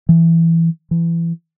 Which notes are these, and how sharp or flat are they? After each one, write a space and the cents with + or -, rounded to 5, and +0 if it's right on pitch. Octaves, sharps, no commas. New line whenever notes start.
E3 +10
E3 +25